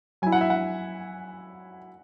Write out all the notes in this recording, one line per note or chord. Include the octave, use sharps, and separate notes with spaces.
F#3 E4 G#5
F#5
E5
F#5